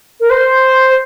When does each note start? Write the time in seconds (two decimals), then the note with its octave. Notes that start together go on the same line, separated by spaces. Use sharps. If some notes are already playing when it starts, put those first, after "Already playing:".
0.20 A#4
0.30 C5